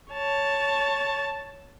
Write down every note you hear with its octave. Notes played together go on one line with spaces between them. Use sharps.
C#5 A5